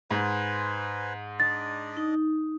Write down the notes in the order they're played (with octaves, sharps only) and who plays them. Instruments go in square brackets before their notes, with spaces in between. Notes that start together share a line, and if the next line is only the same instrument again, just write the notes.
[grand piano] G#2 [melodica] B4 C5 G#5
[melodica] D4 D5 D#5 [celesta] A6
[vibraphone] D#4